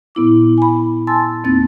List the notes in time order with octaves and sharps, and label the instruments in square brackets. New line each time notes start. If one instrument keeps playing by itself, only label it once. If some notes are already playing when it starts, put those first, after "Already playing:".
[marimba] A#2 B3 E4 D6
G#5 B5
G#5 A5 C6 E6 A6
E2 A#3 C4 D#4 A6